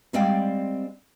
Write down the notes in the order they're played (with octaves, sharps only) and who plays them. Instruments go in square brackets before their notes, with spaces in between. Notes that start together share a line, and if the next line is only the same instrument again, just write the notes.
[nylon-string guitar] G3 G#3 C4 D5 F5 G5